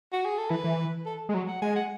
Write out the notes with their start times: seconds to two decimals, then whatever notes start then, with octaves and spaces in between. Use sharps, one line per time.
0.13 F#4
0.25 G#4
0.38 A4
0.50 E3 B4
0.64 E3
1.05 A4
1.29 G#3
1.34 F#3
1.48 F#5
1.62 G#3 G#5
1.75 F#5